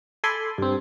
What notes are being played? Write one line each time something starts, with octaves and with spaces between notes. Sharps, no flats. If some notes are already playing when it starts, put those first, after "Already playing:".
A4 G#5 B5 C6 D6
G2 C4